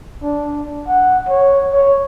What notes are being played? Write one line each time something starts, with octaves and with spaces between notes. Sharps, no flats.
D4
F#5
C#5
C#5